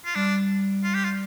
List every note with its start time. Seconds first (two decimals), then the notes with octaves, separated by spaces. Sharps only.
0.05 F4
0.15 G3 D4
0.84 F4
0.95 G4
1.04 F4